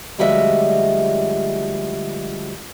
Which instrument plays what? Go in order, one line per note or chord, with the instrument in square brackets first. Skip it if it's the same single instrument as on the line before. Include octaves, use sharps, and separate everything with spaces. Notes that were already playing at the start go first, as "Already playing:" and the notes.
[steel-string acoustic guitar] D2 F3 G3 G#3 F#4 E5